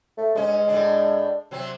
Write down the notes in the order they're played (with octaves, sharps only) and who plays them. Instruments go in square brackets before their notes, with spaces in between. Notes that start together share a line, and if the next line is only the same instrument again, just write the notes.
[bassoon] A3
[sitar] G2 C#4 [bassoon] G#3
[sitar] A2 D4
C3 F#3 C4